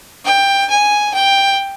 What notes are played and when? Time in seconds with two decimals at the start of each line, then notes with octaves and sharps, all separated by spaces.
0.25 G5
0.70 G#5
1.14 G5